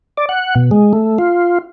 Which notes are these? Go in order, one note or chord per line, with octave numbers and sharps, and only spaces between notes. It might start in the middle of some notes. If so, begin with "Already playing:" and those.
D5
F#5
B2
G#3
A3
F4